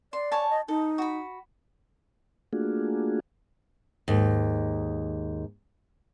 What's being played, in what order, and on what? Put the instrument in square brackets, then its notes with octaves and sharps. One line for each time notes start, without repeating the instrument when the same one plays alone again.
[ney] D5 [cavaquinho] C6
[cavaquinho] C#5 G#5 A5
[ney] D#5
[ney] D#4 [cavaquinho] A4
[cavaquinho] F#4 B5
[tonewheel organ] A3 A#3 D4 F4 F#4 G#4
[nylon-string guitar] D#2 G#2